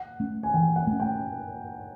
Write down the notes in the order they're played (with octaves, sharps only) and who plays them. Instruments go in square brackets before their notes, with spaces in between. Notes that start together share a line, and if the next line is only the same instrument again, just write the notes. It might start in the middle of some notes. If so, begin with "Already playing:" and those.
Already playing: [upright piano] F#5
[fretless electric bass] A3 C#4
[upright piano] G#5
[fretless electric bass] E3 [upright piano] G5
[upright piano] F#5
[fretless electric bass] A3
C#4
[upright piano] G5